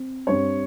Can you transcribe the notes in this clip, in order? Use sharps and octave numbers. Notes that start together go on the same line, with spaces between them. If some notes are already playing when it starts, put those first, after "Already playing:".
Already playing: C4
G2 G3 C4 C#5